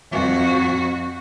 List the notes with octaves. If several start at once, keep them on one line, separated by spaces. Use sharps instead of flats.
F2 F#4